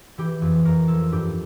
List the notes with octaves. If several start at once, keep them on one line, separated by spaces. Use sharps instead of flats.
E3 G4
F2
F2 A#4
F3 A4
G2 G4